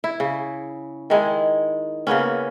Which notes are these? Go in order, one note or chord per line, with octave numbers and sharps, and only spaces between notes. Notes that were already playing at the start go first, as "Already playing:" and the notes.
E4
C#3
D#3 G#3 E4
C#3 A#3 B3 C#4